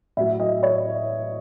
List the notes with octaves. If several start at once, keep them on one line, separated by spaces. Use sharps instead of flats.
A2 F#3 E5
D#5
C#5